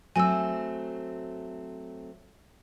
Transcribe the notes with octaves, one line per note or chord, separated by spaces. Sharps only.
F#3 A3 C4 G#5 E6